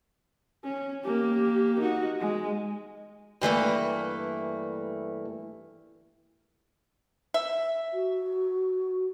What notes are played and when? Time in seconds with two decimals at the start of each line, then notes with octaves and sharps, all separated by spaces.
0.64 C#4
1.04 A#3 G4
1.80 D#4 F#4
2.20 G#3
3.41 G2 E3 A3 A#3
7.34 E5
7.93 F#4